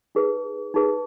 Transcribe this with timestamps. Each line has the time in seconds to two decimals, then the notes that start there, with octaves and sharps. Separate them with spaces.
0.15 D#4 G#4 B4
0.74 D#4 G#4 B4